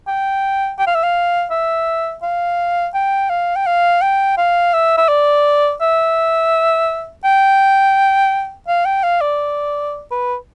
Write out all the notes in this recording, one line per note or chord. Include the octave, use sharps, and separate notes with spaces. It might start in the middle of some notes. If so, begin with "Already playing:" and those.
G5
G5
F5
E5
F5
E5
F5
G5
F5
G5
F5
G5
F5
E5
E5
D5
E5
G5
F5
G5
F5
D5
B4